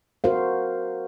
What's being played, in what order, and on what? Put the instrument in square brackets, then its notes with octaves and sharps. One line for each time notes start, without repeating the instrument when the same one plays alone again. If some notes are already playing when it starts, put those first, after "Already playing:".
[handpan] F#4 A#4 C5 F5